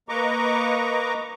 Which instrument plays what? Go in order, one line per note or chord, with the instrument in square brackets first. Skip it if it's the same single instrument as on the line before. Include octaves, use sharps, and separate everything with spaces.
[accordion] A#3 B4 D#5 A#5 C#6 D6